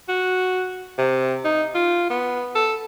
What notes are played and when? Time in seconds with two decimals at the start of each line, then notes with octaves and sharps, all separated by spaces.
0.09 F#4
0.98 C3
1.45 D#4
1.75 F4
2.10 B3
2.55 A4